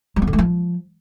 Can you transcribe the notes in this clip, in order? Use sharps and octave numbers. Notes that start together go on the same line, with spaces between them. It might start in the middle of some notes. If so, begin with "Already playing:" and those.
G3
B3
D3
A3
F3